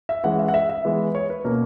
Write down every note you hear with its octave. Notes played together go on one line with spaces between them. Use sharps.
E5
E3 G#3 C#4 F#5
E5
F#5
E5
E5
E3 G#3 B3
C#5
B4
B2 A#3 C#4 A#4